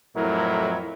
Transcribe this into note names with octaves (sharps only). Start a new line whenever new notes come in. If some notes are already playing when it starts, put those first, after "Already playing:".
F2 A2 F#3 E4 A#4